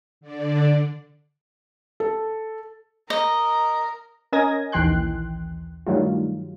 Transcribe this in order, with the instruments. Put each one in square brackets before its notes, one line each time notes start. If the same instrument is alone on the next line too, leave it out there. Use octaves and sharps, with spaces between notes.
[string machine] D3 D4
[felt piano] A4
[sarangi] A#4 [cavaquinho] D#5
[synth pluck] C#4 A#4 D#5 G#5 G#6 A#6
A#1 D#2 E3 G5 C6 F#6
G2 D#3 F#3 G3 A3 F4